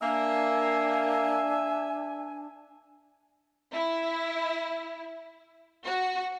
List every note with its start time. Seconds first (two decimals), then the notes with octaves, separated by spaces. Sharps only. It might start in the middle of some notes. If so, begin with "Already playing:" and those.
0.02 A#3 D4 E5 G#5
3.72 E4
5.85 F#4